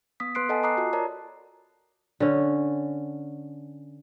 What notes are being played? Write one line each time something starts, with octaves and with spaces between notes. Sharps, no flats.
B3 D#6 B6
B3 B4 C6 F#6 C7 D7
A4 D#5 F#5 G#5 A5
A#5 D6 D#6 F#6 C7
F4 F#4
A#4 C#5 D5 A5 A#5
D3 C#4